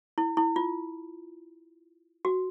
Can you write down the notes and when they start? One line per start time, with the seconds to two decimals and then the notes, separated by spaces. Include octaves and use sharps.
0.18 E4
0.37 E4
0.56 F4
2.25 F#4